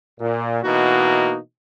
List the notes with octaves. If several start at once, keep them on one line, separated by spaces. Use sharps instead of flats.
A#2
B2 E3 A#3 D#4 F#4